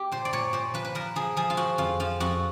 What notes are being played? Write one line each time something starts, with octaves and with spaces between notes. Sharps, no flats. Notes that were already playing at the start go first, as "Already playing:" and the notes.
Already playing: G4
A#2 C5
D5
A#2 C#5
A#2 C5
F3 B4
B4
F3 A#4
F3 G#4
F3 G#4
F4
F3 F#4
F2 F4
F3 F4
F2 F#4